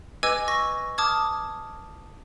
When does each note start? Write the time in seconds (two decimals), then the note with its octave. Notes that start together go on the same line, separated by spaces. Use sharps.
0.23 B4 D#5 G#5 D6 E6 G#6
0.48 C#6 A#6
0.98 A5 D6 D#6 F6 G#6